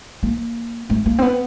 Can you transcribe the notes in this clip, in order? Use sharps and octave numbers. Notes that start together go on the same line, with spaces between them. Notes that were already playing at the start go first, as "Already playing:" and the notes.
A#3
A3
A#3
C4
B3